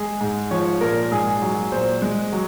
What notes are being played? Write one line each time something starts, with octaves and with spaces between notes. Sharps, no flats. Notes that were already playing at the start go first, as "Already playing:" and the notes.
Already playing: G#3 G#4
G#2
F3 C#5
A#2 A#4
G#2 G#4
F#3
A#2 C5
G#3
F#3